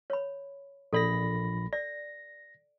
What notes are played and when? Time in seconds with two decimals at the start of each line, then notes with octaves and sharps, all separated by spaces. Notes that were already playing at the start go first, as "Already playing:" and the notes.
0.10 C#5 B5
0.93 A#1 A4 D5 B5 A#6
1.73 D5 A#6